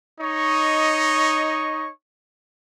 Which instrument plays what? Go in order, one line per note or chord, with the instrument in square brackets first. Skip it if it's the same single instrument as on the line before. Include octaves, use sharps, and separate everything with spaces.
[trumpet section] D#4 C#5 D#5 C#6